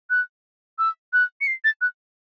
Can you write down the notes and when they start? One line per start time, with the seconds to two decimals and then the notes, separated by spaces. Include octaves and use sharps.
0.10 F#6
0.79 E6
1.13 F#6
1.41 C#7
1.47 C7
1.64 A6
1.81 F#6